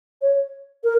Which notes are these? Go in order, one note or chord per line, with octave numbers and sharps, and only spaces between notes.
C#5
A#4